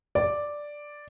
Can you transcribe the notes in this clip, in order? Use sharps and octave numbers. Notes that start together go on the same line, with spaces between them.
D5